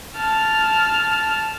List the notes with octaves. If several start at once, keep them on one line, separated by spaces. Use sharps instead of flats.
A5 F6